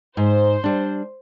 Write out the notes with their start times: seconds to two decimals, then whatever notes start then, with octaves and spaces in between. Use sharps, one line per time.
0.17 G#2 C5
0.64 G3 D4